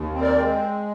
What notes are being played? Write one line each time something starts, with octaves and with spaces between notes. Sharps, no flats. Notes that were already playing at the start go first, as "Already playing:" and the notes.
Already playing: D#2
C4
A#4 D5
G#3